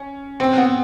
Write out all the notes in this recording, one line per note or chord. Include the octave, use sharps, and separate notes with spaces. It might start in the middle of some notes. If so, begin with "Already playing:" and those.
Already playing: C#4
C4
B3